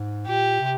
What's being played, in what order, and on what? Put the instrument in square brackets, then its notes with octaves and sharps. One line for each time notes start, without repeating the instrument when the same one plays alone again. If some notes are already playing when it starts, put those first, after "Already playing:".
Already playing: [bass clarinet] G#2
[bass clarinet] A#2 [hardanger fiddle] G4
[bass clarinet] C3